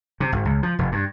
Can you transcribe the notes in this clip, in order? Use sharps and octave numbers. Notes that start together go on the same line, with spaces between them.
C3
G#1
C#2
F3
F1
G2